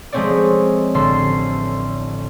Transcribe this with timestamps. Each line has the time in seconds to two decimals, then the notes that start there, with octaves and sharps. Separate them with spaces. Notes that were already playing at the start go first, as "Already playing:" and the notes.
0.12 F3 G#3 A3 C4 C#5 D5
0.94 A1 D3 A4 C6